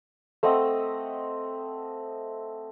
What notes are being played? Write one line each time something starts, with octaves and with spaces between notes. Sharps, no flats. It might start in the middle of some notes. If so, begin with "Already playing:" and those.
A3 C4 D#5 F#5